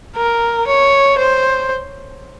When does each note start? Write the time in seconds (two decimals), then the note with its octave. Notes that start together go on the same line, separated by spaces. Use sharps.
0.16 A#4
0.67 C#5
1.18 C5